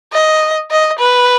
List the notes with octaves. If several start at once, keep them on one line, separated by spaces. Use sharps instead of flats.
D#5
D#5
B4